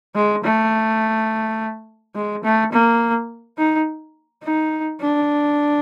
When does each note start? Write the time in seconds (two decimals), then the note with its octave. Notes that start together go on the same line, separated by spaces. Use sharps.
0.15 G#3
0.44 A3
2.15 G#3
2.44 A3
2.72 A#3
3.58 D#4
4.43 D#4
5.00 D4